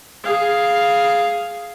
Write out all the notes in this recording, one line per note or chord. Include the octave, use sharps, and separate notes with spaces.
G#4 F5